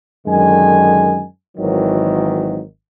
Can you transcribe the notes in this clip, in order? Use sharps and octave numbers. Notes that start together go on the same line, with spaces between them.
F#2 D3 D#3 G#3 G#5
G#1 D#3 E3 F#3